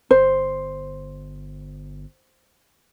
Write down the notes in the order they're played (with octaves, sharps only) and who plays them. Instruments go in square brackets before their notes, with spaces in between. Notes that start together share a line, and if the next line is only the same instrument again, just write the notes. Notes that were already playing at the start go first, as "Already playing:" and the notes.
[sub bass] G1 [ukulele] C5